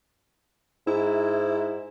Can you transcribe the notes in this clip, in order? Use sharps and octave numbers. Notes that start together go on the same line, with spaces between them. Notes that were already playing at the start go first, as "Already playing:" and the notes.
G#2 E4